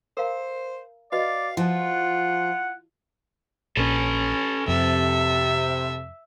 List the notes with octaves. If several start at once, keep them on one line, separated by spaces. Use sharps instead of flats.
A#4 C5 F5 A#5
F#4 B4 D5 D#5 F5
F3 E4 F4 F#5 G#5
A#1 A#2 C#4 A4 B4
F2 C3 E5